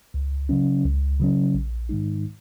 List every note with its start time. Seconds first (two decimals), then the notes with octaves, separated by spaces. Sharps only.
0.14 C#2
0.49 C#3 F#3 C#4
0.84 C#2
1.20 C#3 F#3 C#4
1.54 A#1
1.89 G#2 D#3 G#3 D#4